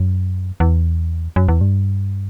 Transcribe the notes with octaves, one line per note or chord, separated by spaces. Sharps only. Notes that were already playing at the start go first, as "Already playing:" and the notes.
Already playing: F#2
E2
F#2
E2
G2